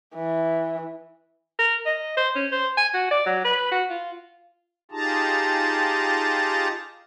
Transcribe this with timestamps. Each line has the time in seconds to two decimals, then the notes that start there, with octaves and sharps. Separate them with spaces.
0.15 E3
1.59 A#4
1.85 D#5
2.17 C5
2.35 C#4
2.52 C5
2.77 G#5
2.94 F#4
3.11 D5
3.26 F#3
3.45 B4
3.71 F#4
3.90 F4
4.91 D#4 F4 G4 G#4 A5 A#5